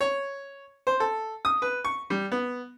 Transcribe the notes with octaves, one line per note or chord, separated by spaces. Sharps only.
C#5
C5
A4
D#6
B4
C#6
G3
B3